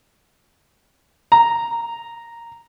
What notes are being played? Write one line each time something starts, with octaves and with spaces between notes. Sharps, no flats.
A#5